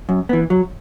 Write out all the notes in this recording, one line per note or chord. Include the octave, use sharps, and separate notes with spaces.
F#2
E3 B3
F#3